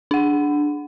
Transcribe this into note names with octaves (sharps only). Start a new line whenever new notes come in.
D4 F#5